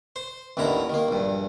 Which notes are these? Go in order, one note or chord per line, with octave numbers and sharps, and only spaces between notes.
C5
A1 D#2 D3 E4 A#5
D#3 A#3
A#1 G2